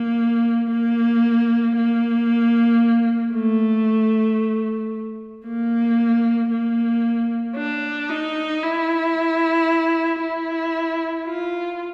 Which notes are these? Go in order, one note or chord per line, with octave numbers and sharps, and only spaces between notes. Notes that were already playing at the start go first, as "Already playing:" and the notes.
Already playing: A#3
A#3
A#3
A3
A#3
A#3
D4
D#4
E4
E4
F4